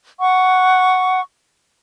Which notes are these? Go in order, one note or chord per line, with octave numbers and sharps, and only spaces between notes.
F#5 C#6